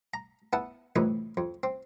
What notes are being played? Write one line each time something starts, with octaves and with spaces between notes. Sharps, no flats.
A#5
B3 E4 F#5 A5
C2 F2 A2 E3 D#4 B4
F2
C4